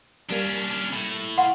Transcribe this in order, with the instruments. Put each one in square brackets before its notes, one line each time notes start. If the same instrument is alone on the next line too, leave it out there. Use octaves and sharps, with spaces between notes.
[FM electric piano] G3 A#3 [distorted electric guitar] C#4 D4
[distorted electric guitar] A2
[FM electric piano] F5 C6 [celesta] F#5